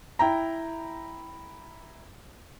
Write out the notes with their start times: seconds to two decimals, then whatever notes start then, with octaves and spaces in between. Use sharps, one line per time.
0.19 E4 G5 A#5